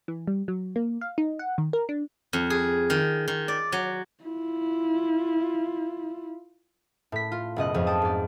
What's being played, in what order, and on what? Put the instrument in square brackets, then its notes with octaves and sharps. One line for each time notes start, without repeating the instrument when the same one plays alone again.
[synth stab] E3
G3
F#3
A#3
F5
D#4
F#5
D#3
A#4
D4
[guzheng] F2
G#4
D#3
D#3
D5
F#3
[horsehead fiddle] E4 F4
[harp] A2 B6
F4
F#1 B2 D#5 F#6
F2 G#2 F3
G5 A5 D#6
G#2 D5